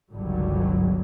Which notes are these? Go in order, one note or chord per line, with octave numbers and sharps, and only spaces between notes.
G1 C#2 D3 D#3 F#3 G3